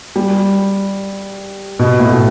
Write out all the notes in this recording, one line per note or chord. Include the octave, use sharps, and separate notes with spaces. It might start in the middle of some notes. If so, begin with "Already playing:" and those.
G3
B2
A2
B2